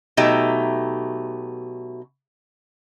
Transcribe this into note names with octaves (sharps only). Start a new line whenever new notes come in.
B2 F#3 A3 D#4 G4 E5